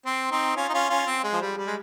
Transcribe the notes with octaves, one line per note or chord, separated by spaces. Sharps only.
C4
C4 D#4
C#4 F4
D#4
C#4 F4
C#4 F4
C4
G#3
F3
G3
G3
G#3